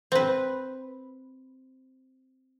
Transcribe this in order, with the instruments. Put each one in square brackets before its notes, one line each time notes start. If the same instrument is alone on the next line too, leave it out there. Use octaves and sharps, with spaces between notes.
[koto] C4 B4